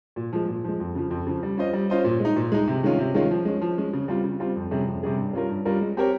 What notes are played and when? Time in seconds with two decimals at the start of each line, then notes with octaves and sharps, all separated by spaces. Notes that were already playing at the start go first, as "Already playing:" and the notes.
0.16 A#2
0.33 F3 G#3
0.48 A#2
0.64 F3 G#3
0.80 F2
0.95 C#3 F3
1.11 F2
1.26 C#3 F3
1.43 G3
1.57 C#4 F4 C5 D#5
1.73 G3
1.90 C#4 F4 C5 D#5
2.04 A#2
2.20 G#3 D#4
2.36 A#2
2.52 G#3 D#4
2.67 C3
2.83 D#3 G#3 C#4 F4
2.99 C3
3.14 D#3 G#3 C#4 F4
3.31 F3
3.45 G#3 C#4
3.61 F3
3.77 G#3 C#4
3.93 C#3
4.08 G3 C4 F4
4.24 C#3
4.40 G3 C4 F4
4.56 F2
4.71 C3 G3 C#4 G#4
4.87 F2
5.03 C3 G3 C#4 G#4
5.18 G2
5.33 G3 C#4 F4 A#4
5.49 G2
5.65 G3 C#4 F4 A#4
5.81 G#3
5.97 C4 G4 A#4 C#5